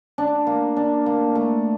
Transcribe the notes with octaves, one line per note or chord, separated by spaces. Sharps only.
D4
A#3
D4
A#3
A3